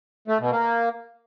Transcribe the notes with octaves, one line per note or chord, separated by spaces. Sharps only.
A3
B2
A#3